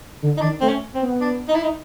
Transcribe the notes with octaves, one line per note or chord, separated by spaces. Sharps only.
D3
D#4
D#3 D4
A3 C4
C#4
C4
B3
D4
D#4
E4
D#4